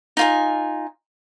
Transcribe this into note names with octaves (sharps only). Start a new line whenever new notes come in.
D#4 F4 G#5